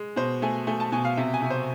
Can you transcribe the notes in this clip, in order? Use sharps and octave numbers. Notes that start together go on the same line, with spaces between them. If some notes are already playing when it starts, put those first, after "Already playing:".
Already playing: G#3
B2 C5
A3 G#5
A3 G#5
A5
B2 G#5
F5
C3 E5
G#5
C3
C5